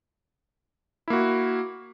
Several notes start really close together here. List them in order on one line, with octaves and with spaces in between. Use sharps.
E4 A#3 F#4